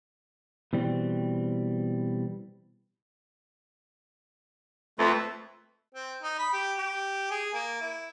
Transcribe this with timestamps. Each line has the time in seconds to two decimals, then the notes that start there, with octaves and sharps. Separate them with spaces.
0.73 B2 E3 G3 C4
4.99 F2 A3 B4 E5
5.95 C4
6.23 D#4
6.39 B5
6.53 G4
6.79 G4
7.31 G#4
7.54 A#3
7.81 E4